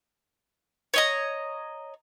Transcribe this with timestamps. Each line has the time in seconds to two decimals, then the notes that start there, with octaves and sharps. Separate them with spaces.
0.94 C#5 D#5 A#5